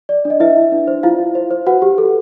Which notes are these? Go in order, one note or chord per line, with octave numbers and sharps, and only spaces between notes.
D5
D4
D#5
E4 B4 E5
E4
D4
C5
E4 F4 F5
E4
C5
C5
F#4 B4 F#5
G4
A4